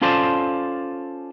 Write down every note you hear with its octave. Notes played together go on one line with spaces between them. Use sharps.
C#4 F4 A4 C5 D5